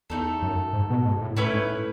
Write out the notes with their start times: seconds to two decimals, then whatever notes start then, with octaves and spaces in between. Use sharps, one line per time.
0.10 E2 A3 D#4 A4
0.42 F#2
0.73 G#2
0.90 B2
1.05 G#2
1.21 A2
1.36 A2 A3 C#4 E4 B4
1.53 G#2
1.69 A2